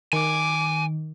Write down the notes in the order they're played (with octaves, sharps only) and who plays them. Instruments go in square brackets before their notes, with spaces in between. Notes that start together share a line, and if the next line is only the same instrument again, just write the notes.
[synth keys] D#3 [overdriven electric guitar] G#5 [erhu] D6